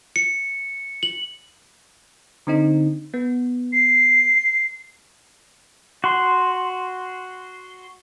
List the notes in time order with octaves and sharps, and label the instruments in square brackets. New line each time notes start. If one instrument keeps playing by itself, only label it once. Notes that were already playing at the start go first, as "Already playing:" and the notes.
[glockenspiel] C#7
F#7
[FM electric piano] D3 C4 D#4
B3
[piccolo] C7
[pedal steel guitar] F#4 C6